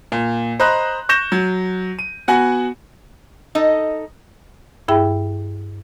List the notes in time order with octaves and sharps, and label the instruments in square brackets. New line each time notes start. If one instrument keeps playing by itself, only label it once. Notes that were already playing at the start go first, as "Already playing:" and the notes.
[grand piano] A#2
C5 D#5 A#5 B5 F#6
C#6 G6 A#6 E7
F#3
D#7
B3 F#4 F#5 G#5
[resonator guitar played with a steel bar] D#4 A4 D#5
[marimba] G2 E4 G#4 E5 G5 B5